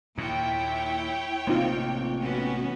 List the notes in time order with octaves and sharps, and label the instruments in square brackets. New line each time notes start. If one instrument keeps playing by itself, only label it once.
[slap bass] D#2 A#2 [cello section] E4 [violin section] C#5 G5
[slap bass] A1 C3 A#3 [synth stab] C4 D#4 F4
[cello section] B3 C#4 F#4